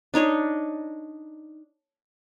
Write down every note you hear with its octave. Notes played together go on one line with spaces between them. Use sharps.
D4 D#4 C#5 D#5